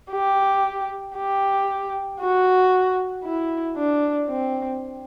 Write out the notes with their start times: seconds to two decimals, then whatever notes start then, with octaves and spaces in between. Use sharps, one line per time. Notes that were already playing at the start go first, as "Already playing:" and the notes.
0.11 G4
1.16 G4
2.21 F#4
3.24 E4
3.77 D4
4.29 C4